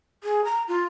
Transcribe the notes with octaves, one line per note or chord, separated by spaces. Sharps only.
G#4
A#5
F4